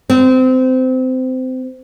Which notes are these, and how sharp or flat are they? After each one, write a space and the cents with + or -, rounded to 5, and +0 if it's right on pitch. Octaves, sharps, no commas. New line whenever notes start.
C4 -25